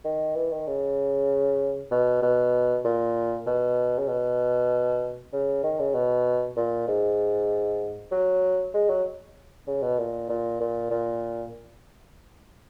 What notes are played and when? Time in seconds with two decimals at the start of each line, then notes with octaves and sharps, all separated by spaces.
0.04 D#3
0.36 E3
0.52 D#3
0.67 C#3
1.91 B2
2.22 B2
2.84 A#2
3.46 B2
3.98 C#3
4.08 B2
5.33 C#3
5.63 D#3
5.79 C#3
5.94 B2
6.56 A#2
6.88 G#2
8.11 F#3
8.74 G#3
8.89 F#3
9.67 C#3
9.83 B2
9.98 A#2
10.29 A#2
10.60 A#2
10.91 A#2